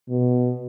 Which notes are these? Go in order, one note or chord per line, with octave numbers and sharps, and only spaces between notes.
B2